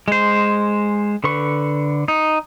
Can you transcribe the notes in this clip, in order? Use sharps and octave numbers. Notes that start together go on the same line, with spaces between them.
G#3 C5
D3 B4 C#6
D#4